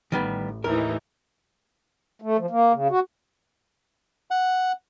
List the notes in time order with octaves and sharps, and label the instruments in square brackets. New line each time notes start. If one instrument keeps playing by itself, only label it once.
[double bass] A1 [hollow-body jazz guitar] D#3 G3 B3
[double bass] D#2 A2 [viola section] E3 D#4 [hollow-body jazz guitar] A#4
[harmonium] A3
F3
A#3
C#3
F#4
[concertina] F#5